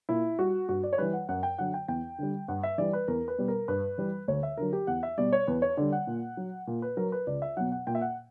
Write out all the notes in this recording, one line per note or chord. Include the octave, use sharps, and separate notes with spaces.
A#2 E4
G3 F#4
G2 F#4
D5
C#5
E3 G3 B4
F#5
F#2 F#5
G5
D3 F#3 F#5
G5
E2 G5
D3 G3
G2 F#5
E5
E3 G3 D5
B4
E2 A#4
B4
B2 G3
A#4
G2 B4
E3 G3
D2 C#5
E5
D3 F#3 A#4
G4
E2 F#5
E5
B2 G3 D5
C#5
E2 B4
C#5
D3 G3 D5
F#5
A#2
F#3
A#2
B4
F#3 A#4
B4
C#2 D5
E5
B2 F#3 F#5
F#5
A#2 G5
E5
F#5